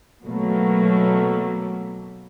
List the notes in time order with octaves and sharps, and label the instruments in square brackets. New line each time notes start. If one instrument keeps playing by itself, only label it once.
[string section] B2 F#3 A3 A#3